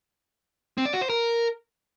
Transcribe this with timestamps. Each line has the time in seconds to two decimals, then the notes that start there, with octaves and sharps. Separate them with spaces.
0.78 C4
0.86 D5
0.94 F#4
1.01 C5
1.09 A#4